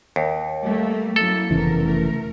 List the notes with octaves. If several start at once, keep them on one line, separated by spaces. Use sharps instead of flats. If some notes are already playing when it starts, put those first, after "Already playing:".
D#2
G3 A3 A#3
F#2 A#3 E4 A4
F1 E2 C#3 E3 F3 A#4
A3 A#4